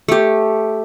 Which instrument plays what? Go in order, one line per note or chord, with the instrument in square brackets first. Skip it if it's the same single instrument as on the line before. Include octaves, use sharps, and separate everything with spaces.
[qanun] A3 G4